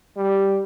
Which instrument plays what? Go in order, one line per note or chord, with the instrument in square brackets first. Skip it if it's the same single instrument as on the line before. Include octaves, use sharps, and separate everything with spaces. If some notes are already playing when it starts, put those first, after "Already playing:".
[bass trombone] G3